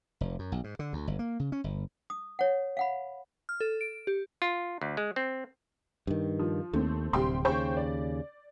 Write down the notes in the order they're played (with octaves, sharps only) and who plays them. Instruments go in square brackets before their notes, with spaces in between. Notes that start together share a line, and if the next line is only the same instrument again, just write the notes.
[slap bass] F1
F#2
B1
G#2
D3
D2
G1
A#3
C#3
C#4
G1
[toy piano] D#6
C#5 F#5
F5 F#5 B5
[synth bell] F6
A4
D7
G4
[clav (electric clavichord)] F4
D2
G#3
C4
[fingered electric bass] G2 D#3
[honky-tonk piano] F3
[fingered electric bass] D#2 [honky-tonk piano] A3 C4
[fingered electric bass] D1 C3 [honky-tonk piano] G3 G5 C6
[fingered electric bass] D#2 C#3 [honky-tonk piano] C5 G5 C#6
[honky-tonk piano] D5